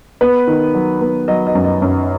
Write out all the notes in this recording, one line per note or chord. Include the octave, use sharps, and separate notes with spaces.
B3 B4
D#3
F#3
B3
F#3 D#5
D#5
F#2
D#5
F#2